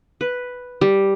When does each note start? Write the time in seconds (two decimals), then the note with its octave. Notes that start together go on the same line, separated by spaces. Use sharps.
0.21 B4
0.81 G3